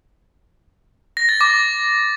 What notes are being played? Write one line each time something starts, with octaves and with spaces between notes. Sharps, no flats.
A#6
A6
D6